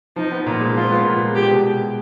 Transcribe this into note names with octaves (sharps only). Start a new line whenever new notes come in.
F3 D#4
B3
A#2
G#3
F3 F4
B3
A#2
G#3
G#3 G4
B2